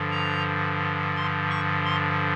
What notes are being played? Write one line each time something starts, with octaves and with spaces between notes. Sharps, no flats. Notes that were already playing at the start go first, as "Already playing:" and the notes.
Already playing: G2 D3 F3
A#5
C6
C#6
C6